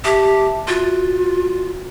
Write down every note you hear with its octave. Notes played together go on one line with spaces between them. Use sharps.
G4 E5 A5
F4 F#4